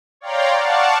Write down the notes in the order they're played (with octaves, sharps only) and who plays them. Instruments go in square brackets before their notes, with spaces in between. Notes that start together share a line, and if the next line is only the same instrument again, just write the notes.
[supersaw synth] C#5 D5 F5 G5 A#5 C6
D5 F5 F#5 A5 C#6